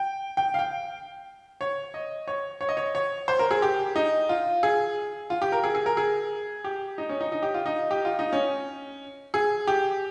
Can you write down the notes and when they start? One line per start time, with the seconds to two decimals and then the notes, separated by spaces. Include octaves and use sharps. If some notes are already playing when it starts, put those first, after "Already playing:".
Already playing: G5
0.37 G5
0.54 F5
0.59 G5
1.61 C#5
1.94 D#5
2.28 C#5
2.61 C#5
2.69 D#5
2.77 C#5
2.95 C#5
3.28 C5
3.39 A#4
3.51 G#4
3.62 G4
3.96 D#4
4.29 F4
4.63 G#4
5.30 F4
5.42 G4
5.52 A#4
5.64 G#4
5.75 G#4
5.86 A#4
5.97 G#4
6.64 G4
6.98 D#4
7.09 C#4
7.21 D#4
7.32 D#4
7.42 G4
7.54 F4
7.66 D#4
7.91 G4
8.05 F4
8.19 D#4
8.33 C#4
9.34 G#4
9.67 G4